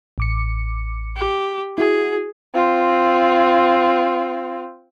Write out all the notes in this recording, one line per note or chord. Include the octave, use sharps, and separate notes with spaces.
A1 D6 C#7
G4
E4 F#4 G#4
C4 F4